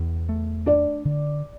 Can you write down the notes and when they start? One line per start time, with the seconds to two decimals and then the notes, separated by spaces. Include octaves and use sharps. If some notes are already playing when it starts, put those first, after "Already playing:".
Already playing: E2 E3
0.29 A3
0.66 D4 D5
1.05 D3